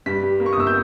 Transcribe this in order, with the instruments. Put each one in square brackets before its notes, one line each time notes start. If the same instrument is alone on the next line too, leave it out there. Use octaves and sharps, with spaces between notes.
[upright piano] G2 B6
G3
A#3
C#6
D#6
G1 E6
G6